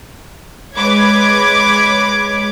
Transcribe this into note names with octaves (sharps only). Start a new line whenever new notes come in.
G#3 B4 C#5 D6 G#6